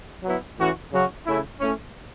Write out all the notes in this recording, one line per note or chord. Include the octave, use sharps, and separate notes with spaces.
F#3 B3 E4
A2 E3 C#4 F#4
C#3 F#3 C#4 F#4
C#3 A3 C#4 E4
A2 A3 C#4